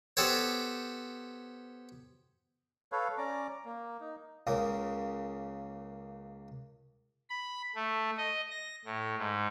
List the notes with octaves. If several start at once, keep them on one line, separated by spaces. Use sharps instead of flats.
B3 G4 A4 C5 C#5
A4 B4 C#5 F5
C#4 D5 A#5 D6
A#3
D#4
C#2 C#3 A#3 D#6
B5
A3
D#5
A#6
A2
G#2